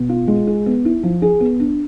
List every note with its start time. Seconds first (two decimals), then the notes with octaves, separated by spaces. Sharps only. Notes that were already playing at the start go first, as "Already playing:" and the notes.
Already playing: B2
0.09 F4
0.28 G#3
0.47 G#4
0.66 B3
0.85 E4
1.03 F3
1.22 G#4
1.40 B3
1.60 D4